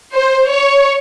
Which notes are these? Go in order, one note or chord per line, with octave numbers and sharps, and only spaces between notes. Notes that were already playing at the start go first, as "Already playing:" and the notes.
C5
C#5